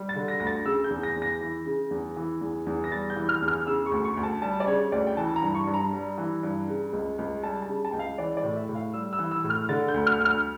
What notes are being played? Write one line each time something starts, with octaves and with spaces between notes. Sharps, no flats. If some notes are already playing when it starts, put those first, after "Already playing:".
Already playing: G3
A6
D3
A#6
D2 A#6
A6
C#3 E6
G6
E2
A#6
E2
A#6
E3
C#3
E2
E3
E2
E2
A#6
G3 A6
G6
E3
F6
E2
F6
C#3 E6
C#6
D2
C#6
D2
A5
G3 A5
D5
C#3 C#5
D2 D5
G5
E3 A5
A#5
G2
C#6
G2
A#5
G3
E3
G2
C#3
C#2
C#2
G3 A5
A5
C#3
A5
C#2 G5
F5
E3 D5
D5
A2
E5
A2
F5
G3 E6
E6
E3
E6
A2
F6
D3 A6
G6
D2
F6
D2
F6